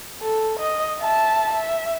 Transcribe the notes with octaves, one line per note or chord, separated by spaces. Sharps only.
A4
D#5
E5 A5
E5